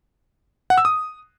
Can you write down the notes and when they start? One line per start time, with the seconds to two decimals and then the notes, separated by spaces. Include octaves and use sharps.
0.70 F#5
0.78 E6
0.85 D#6